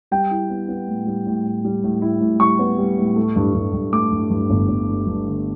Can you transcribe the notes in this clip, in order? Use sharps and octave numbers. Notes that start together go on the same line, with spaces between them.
G3 G5
E4
B3
B3
A2
G3
A2
A2
G3
A2
E4
A2
G3 C#6
B3
G3
A2
A3
G2
G2
G2
A3 D6
G2
G2
G1
G1
G2
G2
D3